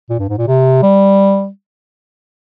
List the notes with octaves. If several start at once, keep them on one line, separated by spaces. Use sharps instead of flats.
A#2
G2
G#2
A#2
C3
G3